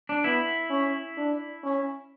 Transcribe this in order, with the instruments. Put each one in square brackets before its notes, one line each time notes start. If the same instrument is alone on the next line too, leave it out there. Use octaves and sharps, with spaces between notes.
[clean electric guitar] D4
[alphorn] B3 [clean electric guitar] E4
[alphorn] C#4
D4
C#4